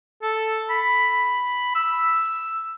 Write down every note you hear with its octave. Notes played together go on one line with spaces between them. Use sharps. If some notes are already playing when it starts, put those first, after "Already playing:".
A4
B5
E6